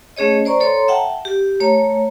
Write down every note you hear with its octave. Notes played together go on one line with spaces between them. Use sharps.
A3 C#4 G#4 C#5 D#5
C5 D5 A#5 C#6
A4 C#5 A#5 C6
E5 F#5 G5 A5
G4
A3 C#5 A#5